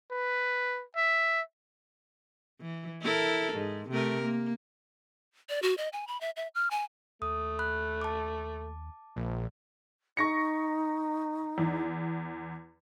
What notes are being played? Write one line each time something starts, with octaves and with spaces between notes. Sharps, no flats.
B4
E5
E3
E4 A4 A#4
G#2
C3 A3 A#4
A#3
D5
F#4
D#5
G#5
B5
E5
E5
F6
G#5
D#2 A3 D#6
B5 F#6
A5 D6
A#1
D#4 C#6 A#6 C#7
E2